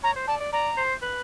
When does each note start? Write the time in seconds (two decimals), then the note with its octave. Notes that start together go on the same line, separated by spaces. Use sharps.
0.03 C#5 A#5
0.16 C5
0.27 D5 A5
0.40 D5
0.52 D5 A#5
0.77 C5
1.02 B4